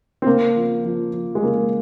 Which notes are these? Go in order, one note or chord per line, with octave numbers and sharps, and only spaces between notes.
C4
C#3 A#3
F3
F3
F3
G#3
C#3 A#3